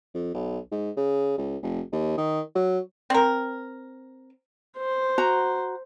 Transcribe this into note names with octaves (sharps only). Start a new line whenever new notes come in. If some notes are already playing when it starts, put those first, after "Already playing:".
F2
B1
G#2
C#3
C#2
F1
D#2
D#3
F#3
C4 A#4
C5
F#4 A#5